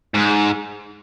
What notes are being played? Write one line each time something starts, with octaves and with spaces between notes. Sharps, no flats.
G#2